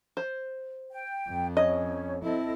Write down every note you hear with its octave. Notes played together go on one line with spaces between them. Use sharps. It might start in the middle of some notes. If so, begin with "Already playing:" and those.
C5
G5
F2
C#4 C#5 D#5
C4 E4 A4 D#5